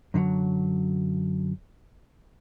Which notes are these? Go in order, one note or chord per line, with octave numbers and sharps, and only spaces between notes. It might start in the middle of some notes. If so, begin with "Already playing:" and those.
F#2 D3 F3 F#3